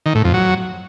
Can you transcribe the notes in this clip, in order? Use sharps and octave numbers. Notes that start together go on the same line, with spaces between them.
D#3
A2
F2
F#3